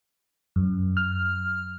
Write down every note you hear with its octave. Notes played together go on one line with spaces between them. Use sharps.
F#2
F6